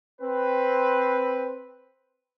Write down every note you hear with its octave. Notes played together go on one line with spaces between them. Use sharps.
C4 B4